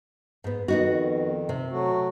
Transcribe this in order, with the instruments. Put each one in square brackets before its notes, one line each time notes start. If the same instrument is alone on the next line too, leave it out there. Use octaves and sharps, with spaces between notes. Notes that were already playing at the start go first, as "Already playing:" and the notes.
[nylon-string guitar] G#2 B3
[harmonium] F2 D#3 [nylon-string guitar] B3 D#4 F#4
[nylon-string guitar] C3
[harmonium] F#3 A3 F#4